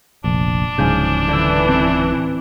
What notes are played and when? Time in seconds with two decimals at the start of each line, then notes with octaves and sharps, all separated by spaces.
0.24 F1 A#1 D4
0.78 D1 G#2 C#3 F3 G#5 G6
1.28 D3 E3 E6
1.68 C4